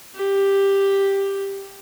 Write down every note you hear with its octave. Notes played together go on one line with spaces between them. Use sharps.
G4